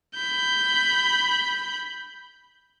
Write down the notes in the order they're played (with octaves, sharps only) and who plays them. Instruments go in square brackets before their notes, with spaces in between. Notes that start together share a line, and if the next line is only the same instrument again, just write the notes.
[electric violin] B5 G6